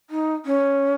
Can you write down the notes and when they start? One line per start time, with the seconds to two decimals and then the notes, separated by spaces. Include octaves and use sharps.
0.10 D#4
0.46 C#4